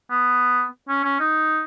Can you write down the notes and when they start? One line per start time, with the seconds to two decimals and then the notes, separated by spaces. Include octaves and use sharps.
0.10 B3
0.88 C#4
1.04 C#4
1.20 D#4